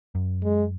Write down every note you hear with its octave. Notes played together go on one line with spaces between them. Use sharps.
F#2
G#3